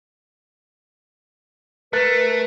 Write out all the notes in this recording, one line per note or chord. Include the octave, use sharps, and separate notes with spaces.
A3 A#4 B4 F#6 A6